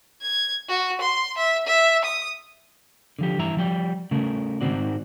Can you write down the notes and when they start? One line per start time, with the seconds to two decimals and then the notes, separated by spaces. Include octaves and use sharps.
0.22 G#6
0.68 F#4
1.01 C6
1.38 E5
1.67 E5
2.05 D#6
3.19 D3 F3 G4
3.38 G2 E3 E5 A#5
3.57 F3 G3 G5
4.11 C#3 A3 A#4
4.61 G#2 D#3 A#3 C4 F#4 D5